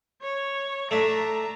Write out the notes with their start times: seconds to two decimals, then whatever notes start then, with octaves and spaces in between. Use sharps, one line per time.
0.22 C#5
0.91 A3 D4 E5 A#5